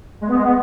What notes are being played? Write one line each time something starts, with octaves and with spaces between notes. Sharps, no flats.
G#3
B3
G#3
B3